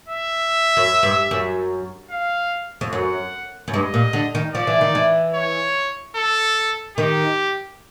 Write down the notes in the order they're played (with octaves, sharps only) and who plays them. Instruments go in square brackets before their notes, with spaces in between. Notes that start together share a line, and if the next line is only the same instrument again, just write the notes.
[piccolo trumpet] E5
[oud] F#2
G2
F#2
[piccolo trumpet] F5
[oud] F2
[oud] F#2 [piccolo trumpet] F#5
[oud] F#2
[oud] G2 [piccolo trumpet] D#5
[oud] A#2
D3
D#3
[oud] F3 [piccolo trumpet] D5
[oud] E3
D#3
E3
[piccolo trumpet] C#5
A4
[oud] D#3 [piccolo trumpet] G4